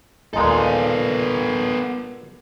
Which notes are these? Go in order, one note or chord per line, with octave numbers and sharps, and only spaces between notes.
A#1 D#2 A#2 G#3 B3 D#4 A4